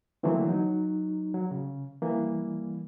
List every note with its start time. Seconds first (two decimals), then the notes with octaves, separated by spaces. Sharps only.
0.23 D3 E3 F#3 A3 A#3 C4
0.49 F#3 D#4
1.34 F#3
1.51 C#3
2.02 E3 G3 A#3